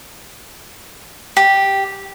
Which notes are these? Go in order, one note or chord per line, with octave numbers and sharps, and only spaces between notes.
G4